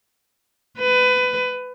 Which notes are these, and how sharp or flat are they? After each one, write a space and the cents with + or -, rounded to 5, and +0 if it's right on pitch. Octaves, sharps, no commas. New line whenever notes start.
B4 +25